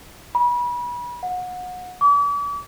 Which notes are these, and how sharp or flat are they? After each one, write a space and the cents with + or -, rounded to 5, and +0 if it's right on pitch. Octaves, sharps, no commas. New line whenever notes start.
B5 -30
F#5 -30
D6 -40